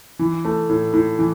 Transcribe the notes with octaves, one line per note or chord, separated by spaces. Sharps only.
E3
A3
A2
A2
E3